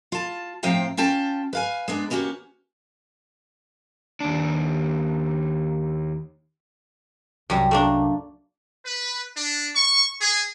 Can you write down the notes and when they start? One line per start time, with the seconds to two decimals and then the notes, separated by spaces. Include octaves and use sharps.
0.12 F4 A5
0.63 A2 F3 C4 F5 G5 A#5
0.97 C#4 F4 G5 A5
1.53 B4 F5 G#5
1.88 G#3 B3 D4
2.10 E3 A#3 C#4 F#4 G4
4.20 D#2 D4
7.50 C2 F#2 G3
7.71 A3 A#3 D4
8.85 B4
9.36 D4
9.76 C#6
10.21 G#4